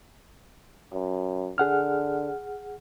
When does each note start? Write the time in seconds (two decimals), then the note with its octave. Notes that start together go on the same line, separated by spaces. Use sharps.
0.92 F#2
1.58 D3 G#4 F#5 F6